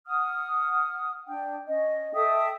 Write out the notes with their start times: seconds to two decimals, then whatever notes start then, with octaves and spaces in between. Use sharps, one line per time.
0.07 F#5 D#6 F6
1.27 D4 G5
1.69 C#4 D#5
2.14 A4 E5 G5 D#6